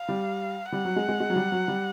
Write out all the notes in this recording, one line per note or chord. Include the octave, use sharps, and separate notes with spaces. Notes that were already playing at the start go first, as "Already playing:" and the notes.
Already playing: F5
G3
G3 F#5
F#3
G#3
G#3
G#3
F#3
G3
F#3
G3